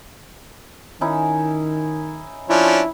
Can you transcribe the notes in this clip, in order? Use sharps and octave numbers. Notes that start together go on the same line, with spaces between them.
D#3 C#4 D#4 E4
F3 C#4 D4 E4